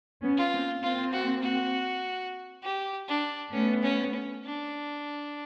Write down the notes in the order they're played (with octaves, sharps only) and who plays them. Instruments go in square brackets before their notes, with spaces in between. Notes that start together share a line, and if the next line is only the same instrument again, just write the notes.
[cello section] B3 C#4
[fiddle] F4
[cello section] A#3 C4
[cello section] A#3 C4 [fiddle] F4
[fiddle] F#4
F#4
G4
D4
[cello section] A3 B3 [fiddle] C#4
[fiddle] C#4
C#4
D4